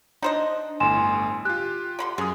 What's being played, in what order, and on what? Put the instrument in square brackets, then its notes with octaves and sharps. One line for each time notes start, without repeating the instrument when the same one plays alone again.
[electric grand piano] D4 [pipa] D#4 C5 D#5
[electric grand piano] G1 A2 [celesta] G#5 C6 E7
[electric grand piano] F4 G4 [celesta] F#6
[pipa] D3 B5 C6
[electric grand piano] F#2 D#6 [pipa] G#4